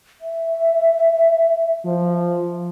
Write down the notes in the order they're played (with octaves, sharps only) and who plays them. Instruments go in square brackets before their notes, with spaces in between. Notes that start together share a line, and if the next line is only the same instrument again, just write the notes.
[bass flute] E5
[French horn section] F3